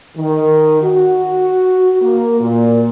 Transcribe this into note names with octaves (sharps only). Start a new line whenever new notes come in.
D#3
F#4
A#3
A#2